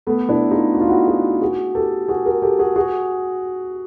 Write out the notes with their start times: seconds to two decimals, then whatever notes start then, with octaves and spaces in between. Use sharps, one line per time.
0.07 A3 B3
0.29 D4 E4
0.51 D#4 F4
0.74 F#4
0.81 F4
0.89 E4 F#4
1.07 F#4 G#4
1.41 F#4 G#4
1.75 G4 A4
2.08 F#4 G#4
2.26 G#4 A#4
2.42 G4 A4
2.59 F#4 G#4
2.76 F#4 G#4